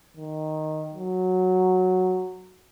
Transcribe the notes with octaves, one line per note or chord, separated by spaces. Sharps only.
D#3
F#3